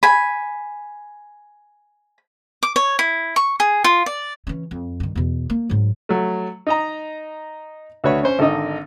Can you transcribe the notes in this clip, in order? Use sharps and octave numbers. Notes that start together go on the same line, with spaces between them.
G#5 B5
D6
C#5
E4
C#6
G#4
F4
D5
E3 C#4
F2
G2 D#3
E2 B2
A#3
G#2 F#3
F#3 A3
D#4 D#5 A#5
D2 F#4 B4 C#5 C#6
C#4 C5 C6
G#1 D3 D#4 D#5